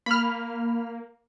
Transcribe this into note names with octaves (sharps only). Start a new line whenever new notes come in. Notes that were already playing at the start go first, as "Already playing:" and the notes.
A#3 B5 F6